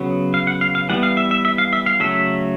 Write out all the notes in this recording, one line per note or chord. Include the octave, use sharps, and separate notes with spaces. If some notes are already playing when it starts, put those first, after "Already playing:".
Already playing: C#3 F#3 B3
F5
F#5
F5
F5
E3 G3 B3 F#5
F5
E5
E5
E5
F5
E5
F5
C#3 F#3 A3 E5